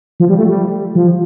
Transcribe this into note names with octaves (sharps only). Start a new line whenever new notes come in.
F3
G3
A3
G3
F3